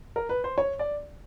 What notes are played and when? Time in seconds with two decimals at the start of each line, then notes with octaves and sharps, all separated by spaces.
0.16 A#4
0.29 B4
0.44 C5
0.58 C#5
0.79 D5